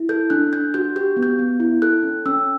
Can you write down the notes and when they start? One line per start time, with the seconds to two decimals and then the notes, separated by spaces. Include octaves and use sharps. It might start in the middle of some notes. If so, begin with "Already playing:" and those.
Already playing: E4
0.09 A4 G6
0.30 D4 F#6
0.53 D4 G6
0.74 F#4 G6
0.96 G4 G6
1.17 B3
1.23 G6
1.39 B3
1.60 E4
1.82 A4 F#6
2.03 C#4
2.26 C#4 E6